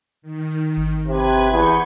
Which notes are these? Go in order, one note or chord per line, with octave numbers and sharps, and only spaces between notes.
D#3
G#1
C3 B4 B5 G#6
E2 C#6 G6 G#6